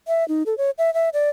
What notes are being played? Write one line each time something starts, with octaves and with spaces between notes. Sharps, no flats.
E5
D#4
A4
C#5
E5
E5
D5